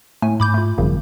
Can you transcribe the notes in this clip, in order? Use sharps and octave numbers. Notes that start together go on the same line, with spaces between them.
A2 A3 G#5
G#2 B5 D6 G6
A3 F4
G#1 F#2 C#3 F3 G3